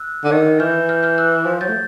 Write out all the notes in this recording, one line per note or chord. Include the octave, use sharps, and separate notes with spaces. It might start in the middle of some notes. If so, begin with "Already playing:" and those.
Already playing: E6 F#6
D3
D#3
E3 F6 G6
F6 G6
F6 G6
E6 F#6
F3
F#3 G6 A6
A3